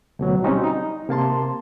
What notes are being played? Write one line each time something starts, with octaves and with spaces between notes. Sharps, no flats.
D2 B2 F#3
G3 C4 C#4 D#4 F#4
D#4
C3 A#3 A5 C6